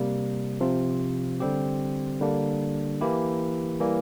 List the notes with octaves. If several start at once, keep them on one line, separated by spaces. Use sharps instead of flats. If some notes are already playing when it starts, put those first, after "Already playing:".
Already playing: C3 G3 A#3
C3 F3 C4 F4
D3 G3 C4 G4
D3 G3 A#3 D4
E3 A#3 E4 G4
E3 G3 A#3